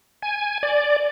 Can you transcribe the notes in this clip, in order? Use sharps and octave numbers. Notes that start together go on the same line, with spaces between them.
G#5
D5